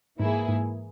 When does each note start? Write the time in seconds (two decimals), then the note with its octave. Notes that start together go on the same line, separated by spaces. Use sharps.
0.19 G#2 E3 A#3 E4 G#4
0.49 G#2